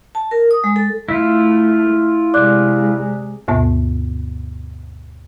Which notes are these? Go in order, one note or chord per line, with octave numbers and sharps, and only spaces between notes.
A5
A#4
D#6
G#3
A4
A3 E4 F4
C3 G#3 D5 D6 F#6
D2 G2 B2 B3